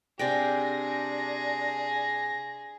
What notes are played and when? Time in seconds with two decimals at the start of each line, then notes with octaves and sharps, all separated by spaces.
0.19 C3 D4 G#4 D5 G5 A#6